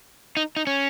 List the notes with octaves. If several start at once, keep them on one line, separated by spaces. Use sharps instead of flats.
D#4
D#4
C#4